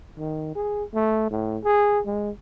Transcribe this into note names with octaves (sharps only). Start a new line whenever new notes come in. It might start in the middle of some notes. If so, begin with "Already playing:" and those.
D#3
G#4
A3
A2
G#4
G#3